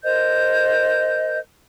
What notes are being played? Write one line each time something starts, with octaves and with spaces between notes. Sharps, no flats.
A#4 C5 D#5 G6